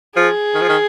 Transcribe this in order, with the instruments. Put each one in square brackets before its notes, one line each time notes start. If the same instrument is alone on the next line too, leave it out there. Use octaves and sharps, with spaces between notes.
[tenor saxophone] F3 [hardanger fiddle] G#4
[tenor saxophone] D#3
F3
D#3